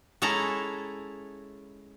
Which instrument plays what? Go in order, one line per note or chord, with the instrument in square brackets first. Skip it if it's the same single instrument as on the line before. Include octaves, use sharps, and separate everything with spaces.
[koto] G#3 C#4 E4 A4 A#5